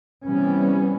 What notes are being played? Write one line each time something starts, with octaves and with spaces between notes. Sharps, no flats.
C3 E3 G3 B3 C#4